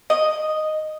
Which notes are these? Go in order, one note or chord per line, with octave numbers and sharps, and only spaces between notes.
D#5